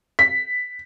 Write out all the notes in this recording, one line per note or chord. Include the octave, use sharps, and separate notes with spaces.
B6